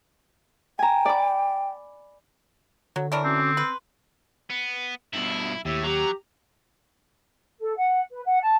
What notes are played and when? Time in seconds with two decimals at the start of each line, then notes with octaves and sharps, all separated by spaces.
0.79 G5 G#5 A#5
1.05 D5 B5 D6
2.96 D3 F#3
3.12 E3 D4 A#4 C#5 B5 C#6
3.24 C4 C#4 F#4 D6
3.57 B4 C6
4.50 B3
5.13 G2 B2 E4
5.65 D#2 A2 G4 E5
5.84 F#3 G4 A#5
7.59 A4
7.76 F#5
8.12 B4
8.25 F#5
8.41 A5